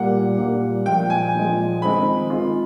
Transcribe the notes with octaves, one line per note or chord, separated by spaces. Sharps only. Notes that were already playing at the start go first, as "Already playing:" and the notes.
Already playing: A#2 G3 A#3 F#5
A#2 G3 A#3
A#2 F3 G#3 G5
G#5
A#2 F3 G#3
D#3 G#3 C4 F4 G#4 B5
D#3 G#3 C4 F4 G#4